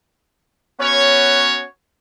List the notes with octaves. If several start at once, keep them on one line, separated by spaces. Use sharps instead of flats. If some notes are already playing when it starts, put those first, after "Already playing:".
B3 C#4 F#4 C#5